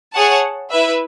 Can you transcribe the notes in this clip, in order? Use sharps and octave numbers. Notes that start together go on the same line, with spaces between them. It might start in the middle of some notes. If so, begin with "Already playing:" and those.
G#4 C#5 F#5 A5
E4 B4 E5